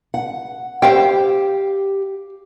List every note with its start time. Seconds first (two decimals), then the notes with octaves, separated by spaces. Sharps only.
0.14 F#5
0.82 G4 C5 F5 G5